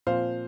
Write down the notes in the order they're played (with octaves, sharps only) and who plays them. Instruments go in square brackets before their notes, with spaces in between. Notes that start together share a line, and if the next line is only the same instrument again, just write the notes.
[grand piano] A#2 F3 C4 C5 F5